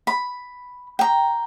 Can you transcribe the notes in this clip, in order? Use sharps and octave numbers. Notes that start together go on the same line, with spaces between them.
B5
G5 A#5